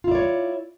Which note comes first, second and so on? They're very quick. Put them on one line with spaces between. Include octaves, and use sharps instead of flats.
F4 E4 D5 C#5